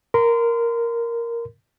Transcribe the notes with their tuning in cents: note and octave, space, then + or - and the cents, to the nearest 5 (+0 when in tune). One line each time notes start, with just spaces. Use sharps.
A#4 +0 C6 -35